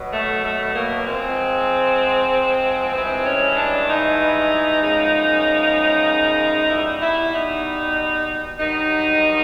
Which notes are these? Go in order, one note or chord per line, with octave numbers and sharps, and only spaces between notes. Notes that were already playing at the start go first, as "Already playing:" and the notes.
Already playing: B2 F#3
A3
A3
A#3
G#2 F3 G#3 C4
G2 E3 G#3 C4
C#4
D4
D#4
F#2 C#3 F3 G#3
B2 G3 E4
E4
D#4
G2 D#3 F#3 D#4